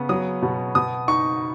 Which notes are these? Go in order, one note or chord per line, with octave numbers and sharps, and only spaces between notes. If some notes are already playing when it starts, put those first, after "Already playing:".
Already playing: C#3 B3
F#3 D#6
B2
B2 D#6
D#4 C#6